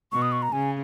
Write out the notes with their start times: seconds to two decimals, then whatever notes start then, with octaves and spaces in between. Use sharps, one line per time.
0.12 B2 C#6
0.22 D#6
0.32 C#6
0.42 A#5
0.52 C#3 G#5